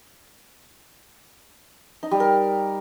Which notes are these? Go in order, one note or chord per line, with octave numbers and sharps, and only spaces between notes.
D#4
G3
A#4